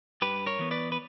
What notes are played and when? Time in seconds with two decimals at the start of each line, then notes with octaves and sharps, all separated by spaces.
0.22 G2 G4 B4
0.46 A#4 C#5
0.59 E3 B3
0.71 B4 D5
0.92 B4